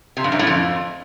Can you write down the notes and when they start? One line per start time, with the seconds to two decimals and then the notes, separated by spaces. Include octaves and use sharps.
0.17 C3
0.24 G2
0.32 F#2
0.39 A2
0.47 F2